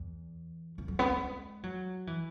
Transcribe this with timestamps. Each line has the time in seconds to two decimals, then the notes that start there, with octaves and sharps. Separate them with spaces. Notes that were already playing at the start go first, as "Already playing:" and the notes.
Already playing: E2
0.78 E2
0.88 F#3
0.99 B3
1.10 G#3
1.63 F#3
2.07 E3